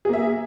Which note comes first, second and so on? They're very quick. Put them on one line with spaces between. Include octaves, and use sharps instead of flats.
G#4 A#3 E5